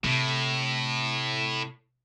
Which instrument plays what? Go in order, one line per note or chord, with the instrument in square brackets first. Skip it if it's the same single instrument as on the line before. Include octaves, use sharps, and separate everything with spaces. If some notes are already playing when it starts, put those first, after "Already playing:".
[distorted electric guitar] A2 [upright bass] C3